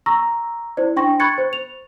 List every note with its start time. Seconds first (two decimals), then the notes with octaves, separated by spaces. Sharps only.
0.06 A#5 C#6 E6 A#6
0.77 E4 C5 D5
0.96 D4 G5 C6 C#6 A#6
1.20 B5 C#6 F#6 G#6 A6 C#7
1.38 C5
1.53 F7